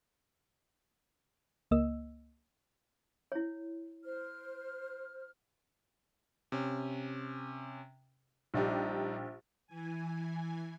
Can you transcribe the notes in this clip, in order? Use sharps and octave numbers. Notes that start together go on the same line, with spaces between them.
C#2 A#3 D#5 E6
E4 C#5
C5 F6
C3 C#4
A#1 G3 D4 D#4 G4
E3 G#5